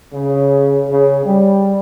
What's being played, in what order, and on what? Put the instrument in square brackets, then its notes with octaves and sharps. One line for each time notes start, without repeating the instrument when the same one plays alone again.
[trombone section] C#3
C#3
G3